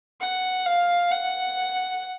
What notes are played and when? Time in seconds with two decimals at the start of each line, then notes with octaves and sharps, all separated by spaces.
0.21 F#5
0.66 F5
1.11 F#5